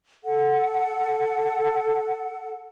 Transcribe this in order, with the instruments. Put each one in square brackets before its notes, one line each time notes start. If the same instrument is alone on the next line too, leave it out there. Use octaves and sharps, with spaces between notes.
[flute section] A4 F#5